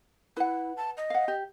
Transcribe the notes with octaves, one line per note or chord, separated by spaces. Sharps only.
E4 B4 F#5
A5
D#5
F5 F#5
G4